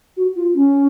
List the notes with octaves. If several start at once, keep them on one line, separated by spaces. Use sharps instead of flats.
F#4
F4
C#4